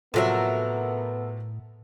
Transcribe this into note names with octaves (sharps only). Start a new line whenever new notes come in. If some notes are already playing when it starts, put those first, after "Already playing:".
A2 C3 F3 F#3 B3 A4 A#4 E5